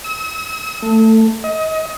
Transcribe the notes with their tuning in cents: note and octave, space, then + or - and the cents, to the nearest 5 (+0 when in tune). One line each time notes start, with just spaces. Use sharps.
E6 -45
A3 +15
D#5 +30